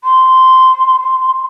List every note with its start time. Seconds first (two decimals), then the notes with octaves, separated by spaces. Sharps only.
0.04 C6